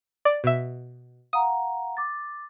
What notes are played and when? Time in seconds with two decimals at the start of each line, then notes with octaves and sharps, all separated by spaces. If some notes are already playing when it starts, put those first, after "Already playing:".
0.25 D5
0.44 B2 E5
1.33 F5 F#5 A#5 D#6
1.97 D6 A6